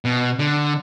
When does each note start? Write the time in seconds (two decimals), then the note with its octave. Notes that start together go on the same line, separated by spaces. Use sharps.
0.05 B2
0.39 D3